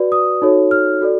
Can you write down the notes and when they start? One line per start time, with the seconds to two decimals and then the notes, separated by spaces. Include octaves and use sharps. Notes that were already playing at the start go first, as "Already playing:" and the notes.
Already playing: F#4 B4 D5
0.12 D#6
0.42 D#4 F#4 A4 C#5
0.71 F6
1.01 F#4 A4 D5